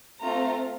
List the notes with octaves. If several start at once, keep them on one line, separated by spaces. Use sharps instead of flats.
A3 C4 F4 A#5